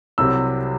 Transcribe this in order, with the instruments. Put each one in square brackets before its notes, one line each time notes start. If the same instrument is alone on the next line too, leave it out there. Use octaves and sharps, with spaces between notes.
[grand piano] C2 C3 F#3 E6